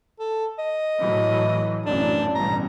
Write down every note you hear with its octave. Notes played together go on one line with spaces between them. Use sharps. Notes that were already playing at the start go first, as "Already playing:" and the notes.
A4
D#5
A2 E3 F#3
A1 F#2 D4
A1 G2 B2 A#5